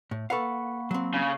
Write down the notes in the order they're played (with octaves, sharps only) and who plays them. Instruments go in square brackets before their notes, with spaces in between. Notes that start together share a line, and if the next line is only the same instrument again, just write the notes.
[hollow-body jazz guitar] A2
[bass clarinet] A#3 [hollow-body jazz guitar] A4 B4 F5 [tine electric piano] F#5 B5 C#6
[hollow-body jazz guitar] F#3 C4
[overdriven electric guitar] C#3